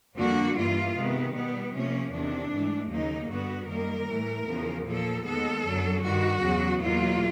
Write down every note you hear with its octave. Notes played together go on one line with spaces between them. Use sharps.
F2 D3 G3 A#3 F#4
G2 E3 G3 A#3 F4
C3 D#3 G#3 B3
B2 G3 B3
C3 F3 A#3 C#4
E2 C3 D#3 D4
G#2 E3 A3
D#2 C#3 F#3 A#3 D#4
G2 D3 G3 B3 F#4
F#2 D#3 G3 A#3 A#4
A2 E3 A3
E2 C#3 F3
A#2 F3 A#3 A4
D#2 D#3 G#3 B3 A4
F#2 D3 F#3
G2 D#3 G3 F#4
E2 C#3 F#3
E2 B2 F#3 A#3 F4